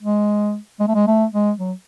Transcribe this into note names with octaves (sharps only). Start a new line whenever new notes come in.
G#3
G#3
A3
G#3
A3
G#3
F#3